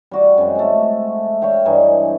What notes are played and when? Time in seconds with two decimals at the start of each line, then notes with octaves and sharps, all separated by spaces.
0.11 G3 F#4 D6
0.38 F#2 C3 G#3
0.55 G#3 A3
1.41 C#5 E5 F5 G5
1.65 G2 E3 D#4 G#5